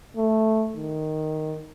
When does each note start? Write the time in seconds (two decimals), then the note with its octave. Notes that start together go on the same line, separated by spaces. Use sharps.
0.17 A3
0.76 D#3